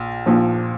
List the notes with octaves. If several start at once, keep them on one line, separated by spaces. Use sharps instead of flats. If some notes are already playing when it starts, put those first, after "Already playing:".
Already playing: A#1
A#1 A#2 F3